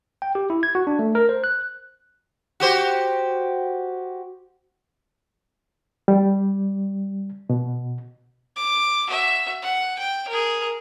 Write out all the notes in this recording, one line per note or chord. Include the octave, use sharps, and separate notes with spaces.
G5
G4
E4
G#6
F#4
D4
A3
A#4
C5
F#6
F#4 G4 C5
G3
B2
D6
F#4 E5
F#5
G5
G#4 A#4